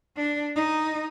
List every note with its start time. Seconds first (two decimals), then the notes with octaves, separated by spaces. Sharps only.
0.16 D4
0.56 D#4